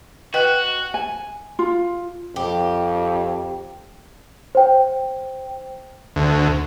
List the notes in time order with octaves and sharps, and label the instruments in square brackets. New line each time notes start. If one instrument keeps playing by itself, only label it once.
[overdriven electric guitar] F#4 [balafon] B4 D#5 G5 [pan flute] F#6
[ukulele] G#5
F4
[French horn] F2 [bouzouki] G4
[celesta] C5 G5
[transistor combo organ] D2